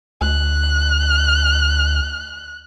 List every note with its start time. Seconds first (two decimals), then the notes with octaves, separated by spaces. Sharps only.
0.21 D2 F#6